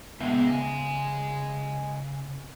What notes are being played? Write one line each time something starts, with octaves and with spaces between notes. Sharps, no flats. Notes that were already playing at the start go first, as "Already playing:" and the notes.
C#2 A#2 G#3 B3 E5
C#3 D#5 G#5